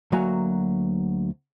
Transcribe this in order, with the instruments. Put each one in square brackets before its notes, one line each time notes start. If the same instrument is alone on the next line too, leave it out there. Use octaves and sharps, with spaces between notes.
[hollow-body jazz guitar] D2 F#3 A#3 F#4 G#5 A#5